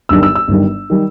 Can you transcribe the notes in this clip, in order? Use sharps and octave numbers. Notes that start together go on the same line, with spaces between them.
G1 G2 D#3 G3 E6
E6
E6
G1 G2 D#3 G3
D#3 G3